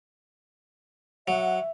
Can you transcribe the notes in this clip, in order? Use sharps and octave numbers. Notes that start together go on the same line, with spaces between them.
F#3 E5 F#5